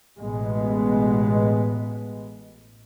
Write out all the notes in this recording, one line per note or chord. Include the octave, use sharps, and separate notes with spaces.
A1 B2 G#3 B3